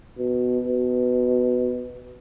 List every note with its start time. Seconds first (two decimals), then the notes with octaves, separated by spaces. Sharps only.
0.19 B2
0.64 B2